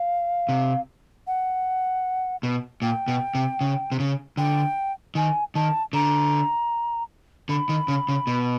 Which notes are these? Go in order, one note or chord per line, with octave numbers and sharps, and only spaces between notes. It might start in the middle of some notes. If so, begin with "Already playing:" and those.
Already playing: F5
C3
F#5
B2
A#2 G5
B2
C3
C#3
C3
C#3
D3 G5
D#3 G#5
D#3 A5
D3 A#5
D3 B5
D#3
C#3
C#3
B2